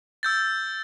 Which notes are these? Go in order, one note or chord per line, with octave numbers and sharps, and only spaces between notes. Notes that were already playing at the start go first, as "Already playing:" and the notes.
E6 G6 A6